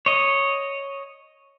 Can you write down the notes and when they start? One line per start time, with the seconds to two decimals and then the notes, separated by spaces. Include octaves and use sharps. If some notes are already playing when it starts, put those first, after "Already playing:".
0.06 C#5 D#5